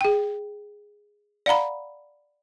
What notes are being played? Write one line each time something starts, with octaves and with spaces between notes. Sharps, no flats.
G#4 G5
D5 F5 F#5 A#5 B5